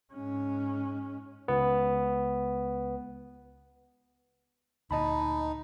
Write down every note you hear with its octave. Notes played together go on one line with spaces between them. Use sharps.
G#2 C#4
C#2 B3
D2 A#2 D3 D#4 D#5 A5 B5